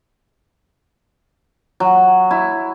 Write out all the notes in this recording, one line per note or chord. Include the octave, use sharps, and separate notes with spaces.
F#3
E4